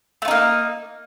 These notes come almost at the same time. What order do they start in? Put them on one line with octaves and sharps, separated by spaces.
A3 F4 D#4 A#3